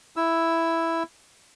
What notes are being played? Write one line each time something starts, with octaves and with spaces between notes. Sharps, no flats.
E4 E6